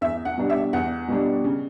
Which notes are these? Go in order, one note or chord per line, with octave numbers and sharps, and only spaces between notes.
E2 E5
F#5
B2 G3 D4
E5
E2 F#5
B2 G3 D4
C#3